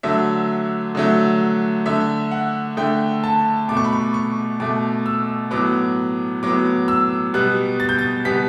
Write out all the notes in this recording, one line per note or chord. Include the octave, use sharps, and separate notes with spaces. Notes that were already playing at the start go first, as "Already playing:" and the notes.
D3 F#3 A3 E5
D3 F#3 A3
D3 A3 E5
F#5
D3 A3 G5
A5
B2 A3 D6
C#6
B5
C#6
C#6
B2 A3 D6
E6
A2 F#3 B3 D6
A2 F#3 B3 D6
E6
B2 G3 B3 F#6
A6
G6
A6
B2 G3 B3 B6